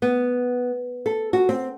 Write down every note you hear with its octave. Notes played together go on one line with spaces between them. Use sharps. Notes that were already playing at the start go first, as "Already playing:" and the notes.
B3
A4
F#4
C4